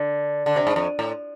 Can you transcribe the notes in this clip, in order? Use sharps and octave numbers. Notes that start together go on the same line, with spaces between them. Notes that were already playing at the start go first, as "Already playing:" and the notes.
Already playing: D3
D3
C3
G#2
F2
A2